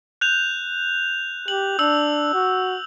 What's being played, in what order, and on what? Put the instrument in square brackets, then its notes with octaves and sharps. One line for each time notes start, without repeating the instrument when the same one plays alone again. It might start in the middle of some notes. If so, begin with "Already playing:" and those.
[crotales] F#6 G6 F7
[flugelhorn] G4 [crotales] F#7
[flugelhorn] D4 [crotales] E6 F#7
[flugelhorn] F#4